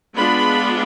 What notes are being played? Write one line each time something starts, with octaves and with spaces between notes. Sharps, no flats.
G#3 B3 D4 F4 B5